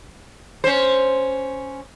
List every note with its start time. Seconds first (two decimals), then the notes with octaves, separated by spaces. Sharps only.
0.64 C#4 C5